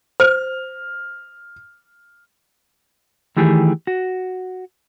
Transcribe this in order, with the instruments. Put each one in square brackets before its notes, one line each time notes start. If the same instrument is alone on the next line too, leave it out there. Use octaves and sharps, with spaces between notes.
[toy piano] C5 [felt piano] F6
[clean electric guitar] D#3 E3 A3 G4 G#4
F#4